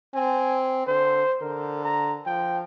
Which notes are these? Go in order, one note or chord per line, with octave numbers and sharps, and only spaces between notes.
C4 G#5
D3 C5
D3 A#4
A#5
F3 G5